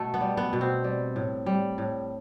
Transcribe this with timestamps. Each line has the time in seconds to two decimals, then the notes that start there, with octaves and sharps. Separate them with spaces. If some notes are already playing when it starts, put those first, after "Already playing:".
Already playing: B2 A3
0.14 B3
0.21 G3
0.37 B3
0.53 B2
0.61 C4
0.84 G3
1.16 A2
1.46 G3
1.78 A2